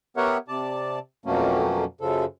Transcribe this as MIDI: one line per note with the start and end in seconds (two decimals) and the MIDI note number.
0.17 0.37 59
0.17 0.37 67
0.17 0.37 70
0.17 0.37 73
0.17 0.37 76
0.17 0.37 78
0.48 0.99 48
0.48 0.99 74
0.48 0.99 81
1.26 1.84 41
1.26 1.84 47
1.26 1.84 54
1.26 1.84 57
1.26 1.84 58
1.26 1.84 61
2.01 2.25 42
2.01 2.25 49
2.01 2.25 53
2.01 2.25 69